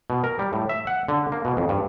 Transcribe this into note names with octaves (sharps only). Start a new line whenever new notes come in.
B2
A#4
G3
A2
E5
F#5
D3
A#3
B2
F2
G2